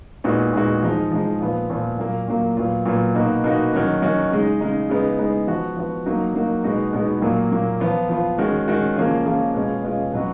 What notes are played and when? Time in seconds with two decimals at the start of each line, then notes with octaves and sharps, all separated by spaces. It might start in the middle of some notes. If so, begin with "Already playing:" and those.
0.24 A#2 G#3 B3 D#4 F#4
0.53 A#2 G#3 B3 D#4 F#4
0.83 F3 G#3 D#4
1.12 F3 G#3 D#4
1.41 A#2 F3 B3 F4
1.70 A#2 F3 B3 F4
1.99 A#2 F#3 A#3
2.28 A#2 F#3 A#3
2.57 A#2 F#3 B3 F4
2.86 A#2 F#3 B3 F4
3.15 B2 A#3 D#4 F#4
3.44 B2 A#3 D#4 F#4
3.73 D#3 F#3 C#4 F#4
4.02 D#3 F#3 C#4 F#4
4.31 C#3 G#3 D#4
4.61 C#3 G#3 D#4
4.90 C#3 G#3 B3 D#4
5.18 C#3 G#3 B3 D#4
5.47 F3 B3 F#4
5.77 F3 B3 F#4
6.06 F#3 A#3 D#4 F#4
6.35 F#3 A#3 D#4 F#4
6.64 B2 G#3 B3 D#4 F#4
6.93 B2 G#3 B3 D#4 F#4
7.22 A#2 F#3 A#3
7.51 A#2 F#3 A#3
7.80 F3 B3 F4
8.09 F3 B3 F4
8.38 D#3 G#3 C#4 F#4
8.68 D#3 G#3 C#4 F#4
8.96 C#3 F3 A#3 C#4 F4
9.25 C#3 F3 A#3 C#4 F4
9.54 B2 G#3 C#4 F4
9.84 B2 G#3 C#4 F4
10.12 B2 F#3 C#4 F#4